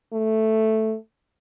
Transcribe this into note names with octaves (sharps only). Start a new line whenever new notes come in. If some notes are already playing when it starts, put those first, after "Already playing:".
A3